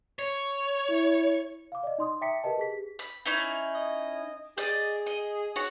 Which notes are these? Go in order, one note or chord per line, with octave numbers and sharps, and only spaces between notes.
C#5
E4
F5 D6
D5 D#5
D#4 C6 D#6
E5 G5 A#5 D6 B6 C#7
G4 A#4 B4 D#5 A5
G4 G#4 B6
B5
C#4 D#4 E4
D#5
G#4 D5 D#5
D#5
F#4 C#5